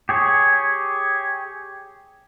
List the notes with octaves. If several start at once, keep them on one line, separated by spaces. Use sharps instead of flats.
G4 G#4 C#5